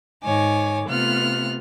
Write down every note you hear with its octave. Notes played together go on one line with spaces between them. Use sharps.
G#2 D#3 C#5 G#5 D6
C3 A3 B3 F4 F6 F#6